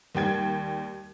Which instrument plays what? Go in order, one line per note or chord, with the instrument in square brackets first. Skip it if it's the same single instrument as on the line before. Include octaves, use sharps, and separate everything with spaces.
[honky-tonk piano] D#2 G3 G5 G#6